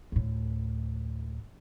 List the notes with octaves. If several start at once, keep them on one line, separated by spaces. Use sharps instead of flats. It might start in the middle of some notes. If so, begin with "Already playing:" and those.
D2 A2